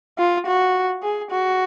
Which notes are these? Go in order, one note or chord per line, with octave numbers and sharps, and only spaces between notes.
F4
F#4
G#4
F#4